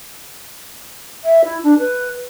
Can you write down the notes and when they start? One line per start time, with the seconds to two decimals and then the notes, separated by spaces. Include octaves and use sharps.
1.24 E5
1.44 E4
1.63 D4
1.79 B4